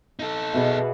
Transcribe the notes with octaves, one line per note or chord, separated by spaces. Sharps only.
D#4 A4
B2 G#4 E5